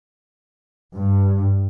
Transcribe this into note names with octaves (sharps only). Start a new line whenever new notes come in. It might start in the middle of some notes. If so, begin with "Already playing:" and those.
G2